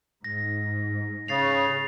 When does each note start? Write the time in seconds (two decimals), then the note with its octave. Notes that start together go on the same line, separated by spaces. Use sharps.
0.24 G#2 A#6
1.28 C#3 A6 C7 F7